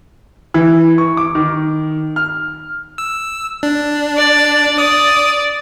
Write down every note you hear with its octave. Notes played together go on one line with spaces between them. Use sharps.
E3
C#6
D6
D#3
F6
E6
D4
D5
D5 D#6